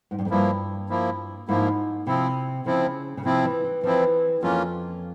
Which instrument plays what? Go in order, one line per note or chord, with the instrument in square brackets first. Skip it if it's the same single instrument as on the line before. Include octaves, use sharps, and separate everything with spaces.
[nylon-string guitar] G#2
G2
F2
[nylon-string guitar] G2 [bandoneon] F3 A#3 E4
[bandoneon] F3 A#3 E4
[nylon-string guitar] G#2 [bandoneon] F3 A#3 E4
[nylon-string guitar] C3 [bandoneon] F3 C4 E4
[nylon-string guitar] C#3 [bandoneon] F3 C4 E4
[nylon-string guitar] C#3
[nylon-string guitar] C3 [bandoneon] F3 C4 E4
[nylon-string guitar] E3
E3
[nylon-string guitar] E3 [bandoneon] F3 C4 E4
[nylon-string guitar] F2 [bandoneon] E3 A#3 C#4 F4